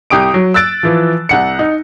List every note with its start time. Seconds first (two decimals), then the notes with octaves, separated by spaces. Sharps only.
0.10 C2 G4 D#6 D7
0.34 F#3
0.54 E6 F#6 A6 D7
0.83 E3 F3
1.29 C2 F#5 C#7
1.59 D#4